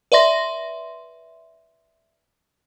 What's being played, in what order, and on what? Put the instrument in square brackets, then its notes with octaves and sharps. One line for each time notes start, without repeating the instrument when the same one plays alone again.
[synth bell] B4 D5 E5 C6 A#6